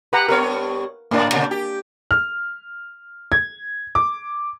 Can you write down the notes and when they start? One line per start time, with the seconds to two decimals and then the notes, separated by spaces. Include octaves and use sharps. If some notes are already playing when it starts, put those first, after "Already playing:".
0.13 G4 B4 F#5 A#5
0.28 G2 B3 A#4 C#5
1.11 G#2 A#3 D4 D5
1.32 A#2 C#3
1.51 G4
2.11 F6
3.32 G#6
3.95 D6